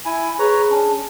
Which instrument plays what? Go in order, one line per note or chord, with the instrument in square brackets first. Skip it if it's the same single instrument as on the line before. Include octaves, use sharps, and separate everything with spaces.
[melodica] E4 G#5
[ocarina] G#4 [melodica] B4 C#5 A#5
[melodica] C#4 D4